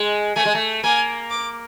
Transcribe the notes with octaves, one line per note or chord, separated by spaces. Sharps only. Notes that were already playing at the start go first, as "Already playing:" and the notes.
Already playing: G#3
A3 G#5
G#3
A3
A#3 G#5
D6